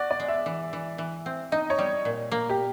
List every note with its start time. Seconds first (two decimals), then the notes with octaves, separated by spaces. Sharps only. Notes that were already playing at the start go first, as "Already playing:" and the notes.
Already playing: F#4 D5
0.11 D5
0.20 G#3
0.28 E5
0.46 E3
0.73 E3
0.98 E3
1.26 C4
1.52 D#4 D#5
1.70 C#5
1.79 G3
2.05 A#2
2.32 A#3
2.50 G4